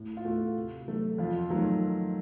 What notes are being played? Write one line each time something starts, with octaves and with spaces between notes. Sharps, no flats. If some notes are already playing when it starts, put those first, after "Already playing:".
Already playing: A2
F4
A3 F#4
C3
F#3 A3
F2 F4
D#3 F#3 A3